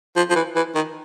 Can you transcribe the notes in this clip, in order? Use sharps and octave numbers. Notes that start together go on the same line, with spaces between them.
F3
F3
E3
E3
D#3